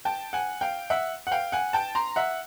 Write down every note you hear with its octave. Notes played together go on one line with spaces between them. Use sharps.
G5 A5
F#5 G#5
F5 G5
E5 F#5
F#5
F5 G5
F#5 G#5
G5 A5
A#5 C6
E5 F#5